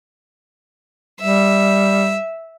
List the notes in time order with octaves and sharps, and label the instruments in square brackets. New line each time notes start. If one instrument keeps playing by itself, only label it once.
[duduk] G3 [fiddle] E5